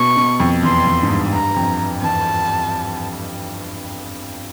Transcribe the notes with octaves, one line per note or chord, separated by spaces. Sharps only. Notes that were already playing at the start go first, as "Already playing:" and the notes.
Already playing: B2 C#6
B2
F2
E2 C6
F2
G#2
G2
G2 A#5
F2
E2 A5